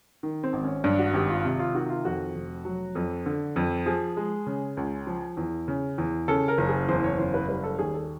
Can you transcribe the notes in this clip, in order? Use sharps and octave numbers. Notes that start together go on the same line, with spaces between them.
D#3
C4
G#1
C#4
G2 D4
F#4
G#1 G4
F4
C3
F4
D#3 F#4
F4
F2 F#4
F1
F#3
F2
D3
F2
F3 G#4
G#3
C#3
C#2
F3
E2
C#3
E2
C#3 A4
A#4
F#1
G#4
E2 C5
C#5
F#1 C5
B4
G3 B4
A4
D#2 G#4
A4